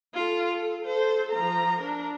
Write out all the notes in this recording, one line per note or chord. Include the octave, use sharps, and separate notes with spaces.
F4 A4
A4
A4 C5
F3 A#5
D4 A#4